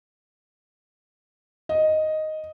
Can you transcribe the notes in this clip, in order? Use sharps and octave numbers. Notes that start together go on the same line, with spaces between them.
D#5